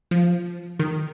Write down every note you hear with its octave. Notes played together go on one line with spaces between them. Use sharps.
F3
D#3